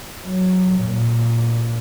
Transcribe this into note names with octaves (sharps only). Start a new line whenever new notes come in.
F#3
A#2